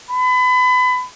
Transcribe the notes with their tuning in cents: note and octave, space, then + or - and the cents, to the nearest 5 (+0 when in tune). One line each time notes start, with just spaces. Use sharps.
B5 +30